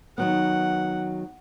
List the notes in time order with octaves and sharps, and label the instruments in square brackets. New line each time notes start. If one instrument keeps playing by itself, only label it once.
[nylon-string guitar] D#3 F#3 B3 [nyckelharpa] F#5